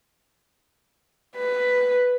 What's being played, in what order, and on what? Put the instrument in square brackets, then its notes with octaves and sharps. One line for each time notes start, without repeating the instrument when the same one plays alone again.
[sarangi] B4